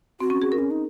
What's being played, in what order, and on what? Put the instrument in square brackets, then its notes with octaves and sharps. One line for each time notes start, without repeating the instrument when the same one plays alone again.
[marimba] C4 [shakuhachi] F#4
[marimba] C#4
G#4
A#4
[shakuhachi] C#4
D#4